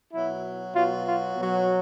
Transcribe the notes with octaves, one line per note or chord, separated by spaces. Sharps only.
B2 F#3 E4
B2 F#3 F4
F4
B2 F#3